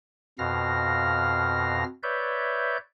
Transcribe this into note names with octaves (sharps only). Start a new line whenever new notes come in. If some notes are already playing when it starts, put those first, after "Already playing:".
F2 B2 F5 F6 A#6
B4 C#5 D5 E5 G6